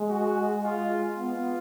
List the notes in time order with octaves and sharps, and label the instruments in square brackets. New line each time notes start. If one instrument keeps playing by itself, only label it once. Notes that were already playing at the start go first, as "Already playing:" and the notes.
Already playing: [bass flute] G#3
[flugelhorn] F#4
F4
[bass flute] B3 [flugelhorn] F4
[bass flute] B3